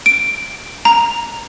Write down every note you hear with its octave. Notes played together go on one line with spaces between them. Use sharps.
D7
A#5